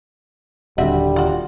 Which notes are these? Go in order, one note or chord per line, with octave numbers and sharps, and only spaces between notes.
D#1 D3 G3 C4 F#4 E5
F4 F#4